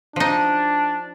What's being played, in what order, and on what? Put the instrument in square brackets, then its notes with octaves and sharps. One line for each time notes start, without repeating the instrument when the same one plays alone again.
[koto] F3 D#4 [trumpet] D4